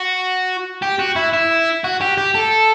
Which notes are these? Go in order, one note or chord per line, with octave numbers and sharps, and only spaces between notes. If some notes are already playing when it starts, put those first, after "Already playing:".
Already playing: F#4
G4
F#4
E4
E4
F#4
G4
G4
A4